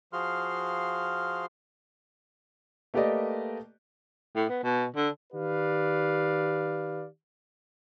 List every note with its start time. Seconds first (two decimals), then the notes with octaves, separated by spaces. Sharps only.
0.13 F3 F#4 G#4 F5 C6 F6
2.94 A3 A#3 G4 B4 D5 D#5
4.35 A2
4.49 B3
4.63 B2
4.96 D3
5.32 D#3 G4 B4 D5 F5